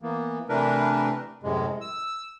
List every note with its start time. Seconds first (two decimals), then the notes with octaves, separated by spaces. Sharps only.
0.02 E3 A#3 B3
0.49 C3 E3 A3 D4 A#4 B4
1.43 F#2 A2 C3 G#3
1.81 E6